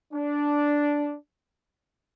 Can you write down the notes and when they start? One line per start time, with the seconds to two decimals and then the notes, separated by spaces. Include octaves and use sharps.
0.13 D4